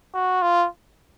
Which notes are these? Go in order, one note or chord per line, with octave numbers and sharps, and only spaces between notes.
F#4
F4